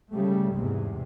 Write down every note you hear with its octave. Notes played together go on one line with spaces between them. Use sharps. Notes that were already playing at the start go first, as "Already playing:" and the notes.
C#3 G3 A3
E2 G#2 C3